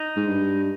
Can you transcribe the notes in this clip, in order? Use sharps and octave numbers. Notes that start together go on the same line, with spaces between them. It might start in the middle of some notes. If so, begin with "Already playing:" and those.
Already playing: D#4
G#2
G2